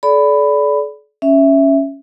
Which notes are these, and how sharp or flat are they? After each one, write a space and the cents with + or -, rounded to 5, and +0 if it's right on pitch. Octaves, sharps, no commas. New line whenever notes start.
A4 -45 D5 -20 B5 +10
C#4 +0 E5 +0